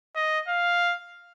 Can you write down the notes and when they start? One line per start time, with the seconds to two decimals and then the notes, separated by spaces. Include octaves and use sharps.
0.16 D#5
0.48 F5